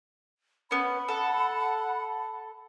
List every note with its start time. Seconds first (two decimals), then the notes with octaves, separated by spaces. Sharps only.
0.71 B3 C#4 B5
1.08 A4 F#5